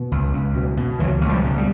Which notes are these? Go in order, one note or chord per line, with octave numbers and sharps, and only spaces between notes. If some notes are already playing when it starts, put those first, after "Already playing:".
Already playing: B2
C#2
C#2
B2
B2
C#2 E3 F#3
C#2
F3 G3
B2
G3